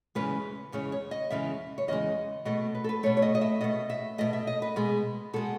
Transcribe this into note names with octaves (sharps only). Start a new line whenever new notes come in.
E2 C#3 E3 G#3 B4
E2 C#3 E3 G#3 C#5
C#5
D#5
E2 C#3 E3 G#3 E5
C#5
E2 C#3 E3 G#3 D#5
B2 A3 D#5
B4
A4
B4
B2 A3 C#5
C#5
D#5
D#5
E5
B2 A3 D#5
E5
B2 A3 D#5
E5
D#5
B4
B2 G#3
B2 G#3 A4